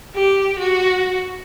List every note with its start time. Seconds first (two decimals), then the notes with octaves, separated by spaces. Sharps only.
0.15 G4
0.59 F#4